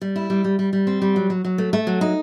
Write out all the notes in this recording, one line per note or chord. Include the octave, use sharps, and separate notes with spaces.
G3
E4
G3
G3
G3
G3
C4
G3
F#3
F#3
F#3
A3
A3
F#3
D#4